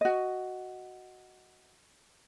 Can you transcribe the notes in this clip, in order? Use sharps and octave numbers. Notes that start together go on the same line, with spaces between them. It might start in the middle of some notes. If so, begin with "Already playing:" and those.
F#4 D#5